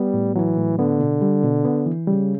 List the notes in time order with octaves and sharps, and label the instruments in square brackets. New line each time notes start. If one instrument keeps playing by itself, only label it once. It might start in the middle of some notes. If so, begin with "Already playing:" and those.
Already playing: [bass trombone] G3 [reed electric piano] B3
[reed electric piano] A2
[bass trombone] E3 [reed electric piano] F#3
[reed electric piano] A2
[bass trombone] D3 [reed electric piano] B3
[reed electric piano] B2
G3
B2
B3
E3
[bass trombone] C#3 [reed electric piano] G3